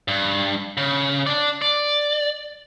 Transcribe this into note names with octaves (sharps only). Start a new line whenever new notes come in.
G2
C#3
D4 D5
D5